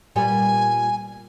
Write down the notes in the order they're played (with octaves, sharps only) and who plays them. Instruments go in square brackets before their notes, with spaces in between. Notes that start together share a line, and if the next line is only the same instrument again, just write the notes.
[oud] A#2 G3 B3 [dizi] G#5